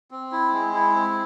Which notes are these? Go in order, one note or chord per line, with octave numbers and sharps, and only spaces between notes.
C4
E4
G#3
E4
C4